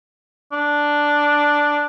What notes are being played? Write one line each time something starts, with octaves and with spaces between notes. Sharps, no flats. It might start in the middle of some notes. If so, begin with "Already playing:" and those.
D4